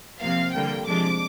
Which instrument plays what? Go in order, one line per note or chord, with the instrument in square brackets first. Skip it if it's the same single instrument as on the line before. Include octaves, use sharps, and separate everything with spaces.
[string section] C3 F3 A#3 F5
D3 G3 A#3 G5
C3 F3 G#3 D4 D6